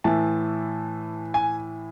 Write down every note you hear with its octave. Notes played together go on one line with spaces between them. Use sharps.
A2 E3 A5
G#5